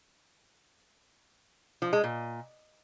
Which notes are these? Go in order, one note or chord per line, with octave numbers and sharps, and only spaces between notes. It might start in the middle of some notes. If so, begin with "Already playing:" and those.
F3
G#3
A#2